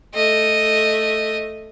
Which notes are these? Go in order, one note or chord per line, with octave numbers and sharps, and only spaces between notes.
A3 D#5